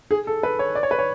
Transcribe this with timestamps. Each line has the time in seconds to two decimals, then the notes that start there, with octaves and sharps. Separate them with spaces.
0.11 G#4
0.27 A4
0.43 B4
0.59 C#5
0.75 D5
0.83 C#5
0.91 B4
0.99 C#5